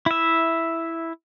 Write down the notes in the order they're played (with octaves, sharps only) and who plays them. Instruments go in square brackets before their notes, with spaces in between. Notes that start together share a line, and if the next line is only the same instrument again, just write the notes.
[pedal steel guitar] E4 E5